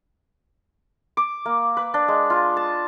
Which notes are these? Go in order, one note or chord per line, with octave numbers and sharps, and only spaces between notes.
D6
A#3
B4
D4
G#3
F4
A5